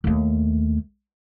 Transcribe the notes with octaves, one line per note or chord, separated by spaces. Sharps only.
D#2 A3